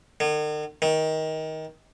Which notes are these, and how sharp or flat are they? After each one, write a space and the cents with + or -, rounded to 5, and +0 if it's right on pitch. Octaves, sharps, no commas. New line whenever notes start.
D#3 -45
D#3 +20